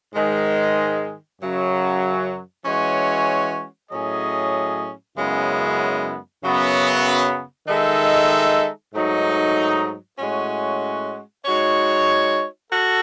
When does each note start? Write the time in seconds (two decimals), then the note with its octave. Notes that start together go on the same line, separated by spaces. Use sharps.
0.13 G#2 D#3 G#3
1.39 F#2 C#3 F#3
2.64 E3 G#3 C#4 F#4 C#5
3.90 A2 F#3 C#4 G#4 D#5
5.16 F#2 C#3 G#3 B3 E4
6.42 F#2 C#3 F#3 B3
7.67 D#3 G#3 D#4 A4 E5
8.93 G#2 F#3 A3 D#4
10.19 A2 G#3 C#4 F#4
11.45 G#3 D#4 F#4 C#5
12.70 F#4 A4